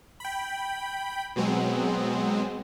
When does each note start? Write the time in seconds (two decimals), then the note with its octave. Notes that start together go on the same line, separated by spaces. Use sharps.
0.20 G5 B5
1.36 B2 F#3 G#3 B3 C4